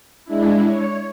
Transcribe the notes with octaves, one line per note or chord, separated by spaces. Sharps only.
G#3 D4 E4
C#5